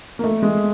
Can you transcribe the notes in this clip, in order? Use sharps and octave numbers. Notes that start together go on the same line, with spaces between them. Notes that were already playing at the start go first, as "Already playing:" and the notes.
A#3
A3
G#3